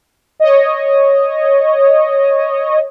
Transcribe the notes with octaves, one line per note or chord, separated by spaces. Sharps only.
C#5 D#5